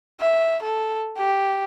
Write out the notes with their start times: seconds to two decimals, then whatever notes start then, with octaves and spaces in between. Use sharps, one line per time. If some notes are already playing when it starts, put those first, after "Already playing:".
0.20 E5
0.63 A4
1.18 G4